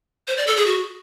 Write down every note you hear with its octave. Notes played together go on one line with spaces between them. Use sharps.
C5
D5
A4
G#4
F#4